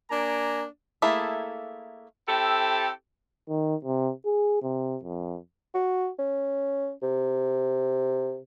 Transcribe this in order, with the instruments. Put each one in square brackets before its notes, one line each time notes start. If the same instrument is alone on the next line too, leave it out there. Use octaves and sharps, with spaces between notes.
[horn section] A#3 D4 G#5 A#5
[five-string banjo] A3 A#3 E4 G#4 A4
[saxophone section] C4 E4 G4 A4
[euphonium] D#3
C3
G#4
C3
F2
[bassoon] F#4
C#4
C3